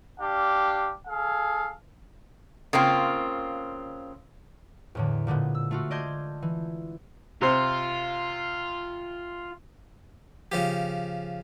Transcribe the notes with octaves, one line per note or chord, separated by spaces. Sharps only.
D4 G4 F5
G#4 A4 F5
C#3 A#3 C4 F4
E2 A2 D3
A#2 D3 G#3 B3
E6
A3 F4 F#4
D5 D#5 A5 C6 G6 G#6
E3
C3 F4 C5
C#3 F3 G4